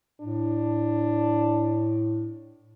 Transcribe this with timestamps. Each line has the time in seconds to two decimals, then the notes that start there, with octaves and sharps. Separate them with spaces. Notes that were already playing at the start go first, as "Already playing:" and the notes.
0.21 A2 D4